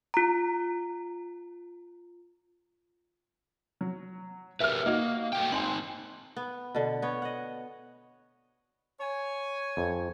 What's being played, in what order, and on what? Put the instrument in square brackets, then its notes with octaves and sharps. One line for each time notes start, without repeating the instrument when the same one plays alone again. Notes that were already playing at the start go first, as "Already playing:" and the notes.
[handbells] F4 A#5
[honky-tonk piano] F#3
[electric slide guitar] G4 A#4 B4 [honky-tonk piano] E5 F6
[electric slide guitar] A#3 [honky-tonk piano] D#4 F#4
[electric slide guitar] A3 F#4 G5
[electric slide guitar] C4 D#4 [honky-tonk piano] G#5 C6 F#7
[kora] B3
B2 D3
B3 C#5
D#5 F#5
[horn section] C#5 G#5
[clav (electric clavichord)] F2